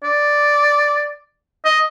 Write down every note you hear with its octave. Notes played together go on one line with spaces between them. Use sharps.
D5
D#5